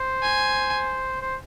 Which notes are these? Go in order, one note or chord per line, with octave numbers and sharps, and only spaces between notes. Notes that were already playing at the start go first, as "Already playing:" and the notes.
Already playing: C5
G#5
C5